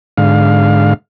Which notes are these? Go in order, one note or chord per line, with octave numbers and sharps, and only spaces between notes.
G#2 D3 F5